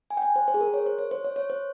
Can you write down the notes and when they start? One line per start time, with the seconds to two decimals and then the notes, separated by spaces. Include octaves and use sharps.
0.10 G#5
0.17 G5
0.22 G#5
0.36 C5
0.48 C5
0.54 G#4
0.61 A#4
0.74 C#5
0.86 C5
0.99 C#5
1.11 C5
1.25 C#5
1.36 C#5
1.50 C5